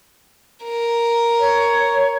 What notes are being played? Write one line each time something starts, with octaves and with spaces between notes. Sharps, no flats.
A#4
C#5